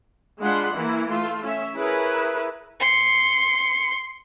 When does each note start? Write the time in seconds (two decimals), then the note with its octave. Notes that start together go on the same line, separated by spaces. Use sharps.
0.40 G#3 D4 F4 F#5 B5 C6
0.76 E3 A#3 E4
1.08 A3 F4
1.44 C#4 E5
1.77 E4 G#4 A#4 B4 C#5
2.80 C6 C#7